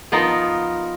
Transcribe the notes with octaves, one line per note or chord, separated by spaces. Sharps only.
F3 B3 D#4 F4 A#4